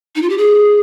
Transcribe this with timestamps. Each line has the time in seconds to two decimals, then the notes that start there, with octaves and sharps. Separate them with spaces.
0.16 D#4
0.22 F4
0.30 G4
0.38 G#4